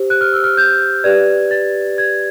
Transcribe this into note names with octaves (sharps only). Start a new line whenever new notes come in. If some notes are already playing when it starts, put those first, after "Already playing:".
Already playing: G4 C5
F#6
F6
E6
F6
G6
G4 B4 D5 G#6
A6
G#6